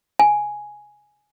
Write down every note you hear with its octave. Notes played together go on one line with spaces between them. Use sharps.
G#5